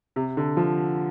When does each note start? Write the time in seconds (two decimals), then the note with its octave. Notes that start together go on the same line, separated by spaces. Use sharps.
0.16 C3
0.37 D3
0.57 F3